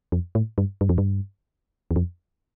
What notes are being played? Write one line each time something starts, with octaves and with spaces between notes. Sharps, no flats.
F2
A2
G2
G2
F2
G2
E2
F2